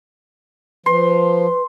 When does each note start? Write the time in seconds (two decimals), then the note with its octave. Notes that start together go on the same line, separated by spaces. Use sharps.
0.86 F3 B4 C6